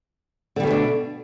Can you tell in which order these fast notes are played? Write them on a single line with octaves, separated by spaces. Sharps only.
D3 G3 B2 A3 D4